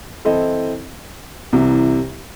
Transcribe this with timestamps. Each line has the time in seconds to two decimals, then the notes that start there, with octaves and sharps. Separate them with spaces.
0.25 E3 C4 E4 A4 D#5
1.53 C2 C3 E3